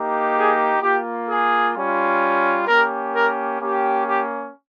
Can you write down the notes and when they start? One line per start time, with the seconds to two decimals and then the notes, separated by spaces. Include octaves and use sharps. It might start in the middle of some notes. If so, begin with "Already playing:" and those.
Already playing: A#3 D#4 G4
0.36 G#4
0.82 A#3 F4 G4
1.29 G#4
1.75 G3 C#4 F4
2.67 A#3 C#4 G4 A#4
3.14 A#4
3.61 A#3 C#4 G4
4.06 G4